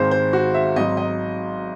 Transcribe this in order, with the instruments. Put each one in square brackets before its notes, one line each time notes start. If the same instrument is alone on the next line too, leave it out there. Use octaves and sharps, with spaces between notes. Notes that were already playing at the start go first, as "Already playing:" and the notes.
Already playing: [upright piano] G#1 G#2 D#3 G#3 C5
C5
F#4
E5
G#1 G#2 F#3 D#5
D#5